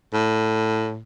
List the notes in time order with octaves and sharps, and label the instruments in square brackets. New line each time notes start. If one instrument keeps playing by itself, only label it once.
[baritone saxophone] A2